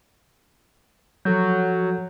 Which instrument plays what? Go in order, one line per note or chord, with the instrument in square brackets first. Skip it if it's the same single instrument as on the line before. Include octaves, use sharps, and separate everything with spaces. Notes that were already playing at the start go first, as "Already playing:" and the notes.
[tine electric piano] F3 A4 G6 [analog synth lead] F#3